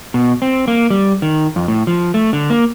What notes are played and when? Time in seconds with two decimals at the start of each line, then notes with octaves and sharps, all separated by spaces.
0.14 B2
0.42 C4
0.68 A#3
0.90 G3
1.22 D#3
1.56 F2
1.68 A2
1.87 F3
2.14 A3
2.33 D3
2.50 A#3